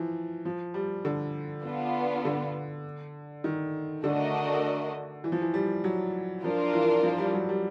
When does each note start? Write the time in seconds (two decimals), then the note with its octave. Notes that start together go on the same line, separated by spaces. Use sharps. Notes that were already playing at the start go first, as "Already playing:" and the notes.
Already playing: E3 F3
0.45 F3
0.74 G3
1.05 D3
1.64 B3 D4 F4
2.25 D3
3.44 D#3
4.04 D3 A3 D4 F#4 A#4 D#5
5.24 E3
5.32 F3
5.42 E3
5.54 G3
5.84 F#3
6.44 F3 D4 F4 A#4
6.73 E3
7.03 F3
7.18 G3
7.34 F#3
7.49 G3